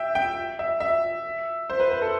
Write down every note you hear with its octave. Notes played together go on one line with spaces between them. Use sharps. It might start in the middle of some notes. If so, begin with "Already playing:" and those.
Already playing: E5 G5
G5
E5
E5
C5
B4
B4
A4